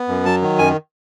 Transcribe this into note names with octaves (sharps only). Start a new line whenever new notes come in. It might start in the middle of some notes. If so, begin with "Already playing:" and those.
Already playing: B3
F#2
F#3 A5
D#3
F#2 G#5